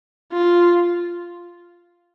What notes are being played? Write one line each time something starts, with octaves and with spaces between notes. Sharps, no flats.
F4